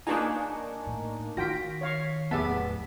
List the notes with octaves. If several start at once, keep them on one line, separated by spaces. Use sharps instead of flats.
A#3 D4 D#4 F4 G#4 B4 G#5 C#6
A2
D#3 F4 F#4 G5 A#6 B6
C#5 F5 C#6
D1 E2 B3 G4 G#4 E5 A5 B6